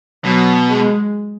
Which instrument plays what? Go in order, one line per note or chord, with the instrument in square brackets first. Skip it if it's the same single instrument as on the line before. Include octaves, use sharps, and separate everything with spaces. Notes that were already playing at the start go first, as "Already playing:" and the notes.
[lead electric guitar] B2 [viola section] F#3
[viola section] G#3